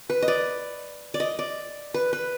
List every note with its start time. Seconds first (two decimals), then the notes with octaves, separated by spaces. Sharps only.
0.10 B4
0.22 D#5
0.28 D5
1.14 D5
1.20 D#5
1.39 D5
1.94 B4
2.13 B4